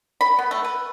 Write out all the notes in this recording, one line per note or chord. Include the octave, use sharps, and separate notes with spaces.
B5
B3
A3
B4